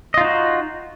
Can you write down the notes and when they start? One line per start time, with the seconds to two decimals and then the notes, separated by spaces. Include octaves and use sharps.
0.14 D#5
0.18 F4
0.21 D#4
0.24 F#4